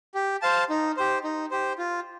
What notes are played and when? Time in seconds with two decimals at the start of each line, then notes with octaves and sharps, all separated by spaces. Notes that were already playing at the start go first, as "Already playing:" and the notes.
0.15 G4
0.42 C5 F5 A5
0.70 D#4
0.97 G4 C5
1.24 D#4
1.51 G4 C5
1.78 F4